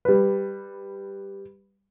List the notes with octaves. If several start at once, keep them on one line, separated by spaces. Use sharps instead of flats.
G3 B4